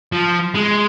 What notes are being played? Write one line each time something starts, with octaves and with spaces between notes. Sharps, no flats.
F3
G#3